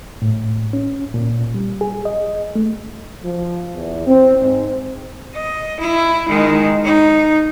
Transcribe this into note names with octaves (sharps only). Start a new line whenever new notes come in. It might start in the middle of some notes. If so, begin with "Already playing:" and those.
A2
C#4
A#2
G3
G#4
D#5
A3
F3
E2
C4
G#2
D#5
E4
D#3 G#3
D#4